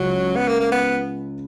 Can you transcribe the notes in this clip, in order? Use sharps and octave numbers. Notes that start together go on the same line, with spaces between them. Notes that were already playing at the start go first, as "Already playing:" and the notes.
Already playing: C#2 C#3 F#3
B3
A#3
A#3
B3